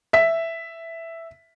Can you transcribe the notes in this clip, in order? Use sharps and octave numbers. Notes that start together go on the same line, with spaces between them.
E5 B6